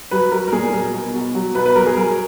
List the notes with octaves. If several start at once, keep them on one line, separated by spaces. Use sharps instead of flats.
F#3 B4
F#3 A#4
A#4
A#2 G#4
F#3 A#4
B2
B2
F#3
B2 B4
B4
F#3 A#4
G#4
F#3 A#4